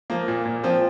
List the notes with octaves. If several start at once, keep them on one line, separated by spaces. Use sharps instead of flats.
F3 A#3
A#2
A#2
F3 C4